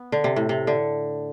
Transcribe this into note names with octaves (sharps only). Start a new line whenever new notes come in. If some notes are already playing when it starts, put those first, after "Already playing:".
Already playing: B3
D3
C3
A2
C3
D3